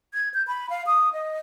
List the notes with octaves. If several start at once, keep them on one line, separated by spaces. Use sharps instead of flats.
G#6
G6
B5
F5
D#6
D#5